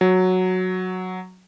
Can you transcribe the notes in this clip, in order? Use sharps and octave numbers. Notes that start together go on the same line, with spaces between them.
F#3